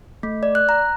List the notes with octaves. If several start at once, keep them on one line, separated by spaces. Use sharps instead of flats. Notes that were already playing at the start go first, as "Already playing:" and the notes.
A3
D5
F#6
A#5